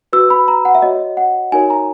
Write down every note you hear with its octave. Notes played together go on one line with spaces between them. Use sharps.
F#4 B4 E6
B5
A#5
F#5
E5
F#4 C#5 D#5
F#5
D#4 F#4 A#4 C#5 G#5
A#5